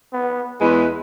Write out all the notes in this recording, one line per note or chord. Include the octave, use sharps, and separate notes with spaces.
B3
E2 G#3 B4